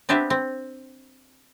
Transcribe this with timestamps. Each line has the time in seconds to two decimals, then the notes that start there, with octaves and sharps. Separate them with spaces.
0.09 B3 C4 D4 G4 B4 E5
0.30 C4